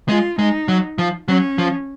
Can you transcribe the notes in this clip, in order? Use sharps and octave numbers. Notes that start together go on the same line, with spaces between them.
G#3 F4
G#3 D#4
F#3
F3
F#3 C#4
F3